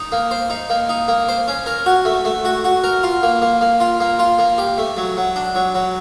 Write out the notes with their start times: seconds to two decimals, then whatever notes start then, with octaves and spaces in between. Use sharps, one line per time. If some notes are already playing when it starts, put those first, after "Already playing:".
Already playing: D#4
0.12 A#3
0.31 C5
0.50 D#4
0.70 A#3
0.89 D#4
1.08 A#3
1.29 C5
1.48 C#4
1.66 A#4
1.86 F#4
2.05 A3
2.25 A3
2.45 F#4
2.64 F#4
2.84 A#4
3.03 F4
3.23 A#3
3.42 A#3
3.61 A#3
3.80 F4
4.00 A#3
4.19 F4
4.39 A#3
4.58 G4
4.78 A3
4.97 F#3
5.17 F#3
5.36 D4
5.55 F#3
5.75 F#3